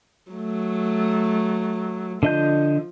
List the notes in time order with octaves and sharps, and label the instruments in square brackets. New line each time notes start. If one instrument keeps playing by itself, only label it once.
[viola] F#3 A3
[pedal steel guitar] D3 D#5 G6 [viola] F3